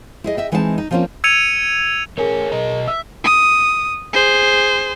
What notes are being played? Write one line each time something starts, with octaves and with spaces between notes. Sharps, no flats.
E4 G#4 D#5
D#5 E5 G5
E3 G#3 C4 D#4 F5 A5
D#4
F3 G3 A#3 C4 C#4 F4
E6 G#6 C#7 D#7 F7
A3 G#4 A#4 C#5 G#5
B2 D#5 A#5
E5 E6
D#6
G#4 C5